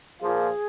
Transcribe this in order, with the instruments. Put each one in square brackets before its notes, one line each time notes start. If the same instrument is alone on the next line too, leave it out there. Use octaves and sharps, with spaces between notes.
[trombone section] A#2 F3 A#3 F4 [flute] G#4